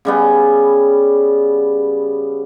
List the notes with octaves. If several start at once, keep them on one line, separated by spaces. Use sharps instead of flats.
C#3 G3 B3